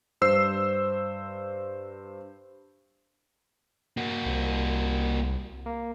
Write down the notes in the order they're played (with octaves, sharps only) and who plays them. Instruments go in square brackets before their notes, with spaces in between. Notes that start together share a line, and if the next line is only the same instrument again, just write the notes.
[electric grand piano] G2 C5 E6 C7
[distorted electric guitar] A#3 F#4
[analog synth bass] C2
A#3